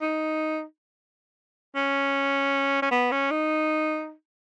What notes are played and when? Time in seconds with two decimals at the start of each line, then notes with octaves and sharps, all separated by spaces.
0.01 D#4
1.75 C#4
2.82 C#4
2.91 B3
3.11 C#4
3.31 D#4